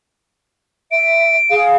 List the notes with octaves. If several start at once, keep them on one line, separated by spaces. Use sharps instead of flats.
E5 D7
G#4 F5